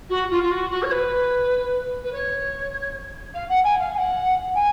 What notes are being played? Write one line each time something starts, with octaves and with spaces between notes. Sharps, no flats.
F#4
F4
F4
F#4
F#4
C#5
B4
B4
C#5
F5
F#5
G#5
F5
G#5
F#5
G#5